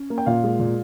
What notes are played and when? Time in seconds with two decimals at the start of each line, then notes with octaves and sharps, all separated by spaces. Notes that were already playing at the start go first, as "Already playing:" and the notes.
Already playing: C#4
0.10 A#3
0.18 G5
0.26 A#2 F4 F5
0.44 G#3
0.59 A#2